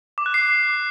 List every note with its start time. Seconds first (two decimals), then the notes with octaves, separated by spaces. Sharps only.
0.18 D6
0.26 F#6
0.34 C7